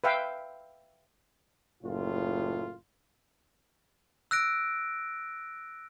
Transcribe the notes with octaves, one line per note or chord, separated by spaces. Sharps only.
B4 E5 F5 G5
F#1 A2 F4
E6 F#6 A#6 D7